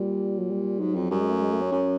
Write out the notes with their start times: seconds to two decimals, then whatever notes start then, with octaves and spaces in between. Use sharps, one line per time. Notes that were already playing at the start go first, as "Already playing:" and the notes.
Already playing: A#2 G3
0.38 F#3
0.50 G3
0.80 G#2 F#3
0.95 F2
1.11 F#2 G3
1.21 G#3
1.31 A3
1.41 G#3
1.52 A3
1.62 C#4
1.72 F#2